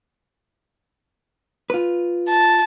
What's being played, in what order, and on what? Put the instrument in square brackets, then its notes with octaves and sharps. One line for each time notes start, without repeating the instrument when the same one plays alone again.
[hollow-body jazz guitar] F4 B4
[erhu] A5